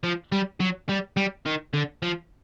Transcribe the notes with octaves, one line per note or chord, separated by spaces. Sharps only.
F3
G3
F#3
G3
G3
D#3
D3
F3